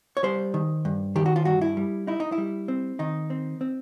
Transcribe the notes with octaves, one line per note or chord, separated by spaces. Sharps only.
C#5
G3 C5
D#3
G2
D#3 G4
F#4
F4
G2 F#4
E4
G3
D#4 E4
D#4
E4
G3
C4
D#3 D#4
C4
C4